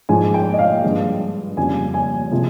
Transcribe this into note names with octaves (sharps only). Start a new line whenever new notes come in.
G#2 F3 G#3 G#5
G5
D#5
F5
G2 F3 G#3
F2 C#3 G3 G#5
G#5
C3 F3 G#3